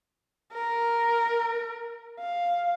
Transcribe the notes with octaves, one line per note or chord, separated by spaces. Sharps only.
A#4
F5